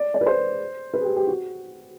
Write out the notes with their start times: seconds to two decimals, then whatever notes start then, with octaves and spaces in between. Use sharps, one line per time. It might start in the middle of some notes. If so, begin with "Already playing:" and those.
Already playing: D5
0.14 D5
0.21 B4
0.26 C5
0.94 B4
1.01 G#4
1.04 G4
1.16 G4
1.27 F#4